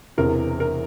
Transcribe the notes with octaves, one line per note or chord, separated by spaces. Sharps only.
E1 E2 C3 E3 A#4
A#4